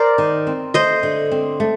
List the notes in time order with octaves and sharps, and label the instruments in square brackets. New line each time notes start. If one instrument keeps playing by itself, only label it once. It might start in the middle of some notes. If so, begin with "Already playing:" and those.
Already playing: [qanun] A#4 C5 D5
[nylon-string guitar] D#3
C4
[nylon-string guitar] A3 [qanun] C5 D#5
[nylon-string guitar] D3
C4
A3